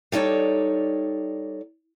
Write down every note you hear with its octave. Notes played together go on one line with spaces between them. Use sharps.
G3 D#4 A4 C#5 D5